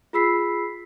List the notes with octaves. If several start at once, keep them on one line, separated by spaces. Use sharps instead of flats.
F4 G#4 B5 E6 B6 C7